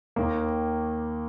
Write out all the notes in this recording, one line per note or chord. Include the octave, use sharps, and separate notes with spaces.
D#2 D#3 A#3